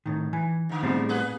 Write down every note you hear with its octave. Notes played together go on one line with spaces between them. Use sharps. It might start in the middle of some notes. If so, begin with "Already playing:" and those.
A2 D#3
E3 G#5
G#2 D3
A2 G3 B3 C4 G4 C5
A#3 G#4 B4